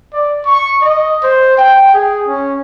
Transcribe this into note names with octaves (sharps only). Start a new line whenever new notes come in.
D5
C#6
D#5
C5
G5
G#4
C#4